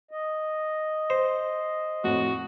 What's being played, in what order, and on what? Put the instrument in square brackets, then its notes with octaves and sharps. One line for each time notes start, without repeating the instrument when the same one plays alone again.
[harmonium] D#5
[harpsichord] C5
[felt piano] F2 A2 [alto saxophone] F#4